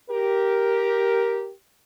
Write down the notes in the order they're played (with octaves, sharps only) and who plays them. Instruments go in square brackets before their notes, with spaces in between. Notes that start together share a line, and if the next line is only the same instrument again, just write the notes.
[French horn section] G4 A#4